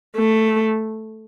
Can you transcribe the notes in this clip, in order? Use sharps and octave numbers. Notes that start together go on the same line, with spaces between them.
A3